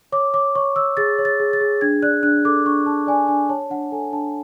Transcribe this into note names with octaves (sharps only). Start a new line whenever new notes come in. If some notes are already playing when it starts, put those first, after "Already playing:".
C#5 D6
C#5 D6
C#5 C#6
C#5 E6
G#4 A6
C#5
A6
G#4
A6
G#4
D4 G#6
D5 F#6
D4 F#6
A4 D6
D4 C#6
D4 A5
D5 G#5
D4 G#5
C#5 A5
D4 F#5
A4 G#5
D4 A5